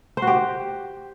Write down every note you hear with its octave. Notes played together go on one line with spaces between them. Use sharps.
C5
F#4
G4